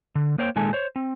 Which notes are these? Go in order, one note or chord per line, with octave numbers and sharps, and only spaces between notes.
D3
A#3 C5 C#5 G5
A#2 D#3 G#3 A4 G#5 A5
C5 C#5
C4